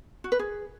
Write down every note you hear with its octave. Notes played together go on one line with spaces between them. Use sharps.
F#4
B4
G#4